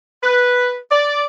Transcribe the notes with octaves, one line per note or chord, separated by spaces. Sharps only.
B4
D5